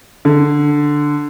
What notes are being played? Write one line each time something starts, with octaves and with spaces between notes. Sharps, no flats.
D3